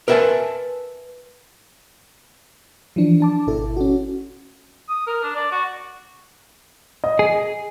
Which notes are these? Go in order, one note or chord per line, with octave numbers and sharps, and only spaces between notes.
A#4 B4 E5 F5 G#5 A5
E3 F3 D4
D4 A5 D6
G#1 B2 E4 A4
C#4 F#4
D#6
A#4
D4
D5
F#4
D#5
G#4